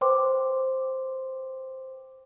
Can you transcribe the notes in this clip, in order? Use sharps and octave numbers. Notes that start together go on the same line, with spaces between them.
B4 C5 G5 C6 D6